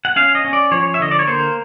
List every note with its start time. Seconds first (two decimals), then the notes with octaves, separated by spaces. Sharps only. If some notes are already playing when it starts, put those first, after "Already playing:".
0.05 F#5
0.16 C#4 F5
0.35 D#5
0.45 C#4
0.53 D5
0.71 F3 C#5
0.94 E5
1.00 D3 D#5
1.11 D5
1.19 C#5
1.27 A#3 C5